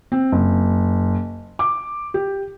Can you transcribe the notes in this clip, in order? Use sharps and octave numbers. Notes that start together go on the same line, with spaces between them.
C4
F#1
D6
G4